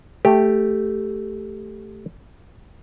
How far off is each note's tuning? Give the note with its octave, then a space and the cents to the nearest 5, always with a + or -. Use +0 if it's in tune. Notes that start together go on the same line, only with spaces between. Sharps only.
A3 +0 G4 +0